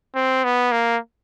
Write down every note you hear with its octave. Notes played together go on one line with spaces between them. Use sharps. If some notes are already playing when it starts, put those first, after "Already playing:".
C4
B3
A#3